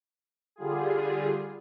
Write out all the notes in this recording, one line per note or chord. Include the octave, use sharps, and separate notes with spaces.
D3 G3 F4 G#4